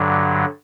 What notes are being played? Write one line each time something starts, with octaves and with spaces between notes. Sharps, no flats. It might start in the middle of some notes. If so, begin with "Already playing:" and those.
Already playing: G2 D3 F#3